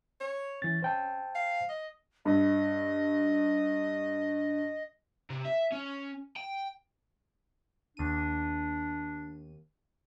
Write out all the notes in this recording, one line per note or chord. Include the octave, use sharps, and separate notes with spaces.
C#5
E3 C#4 A6
C5 G5 A5
F5
D#5
G2 D#5
C3
E5
C#4
G5
D#2 D4 D#7